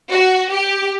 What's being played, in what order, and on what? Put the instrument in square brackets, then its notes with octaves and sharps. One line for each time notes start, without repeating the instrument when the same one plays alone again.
[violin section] F#4
G4